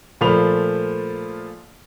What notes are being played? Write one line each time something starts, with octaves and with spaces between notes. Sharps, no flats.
A#2 F3 A3 B5 F7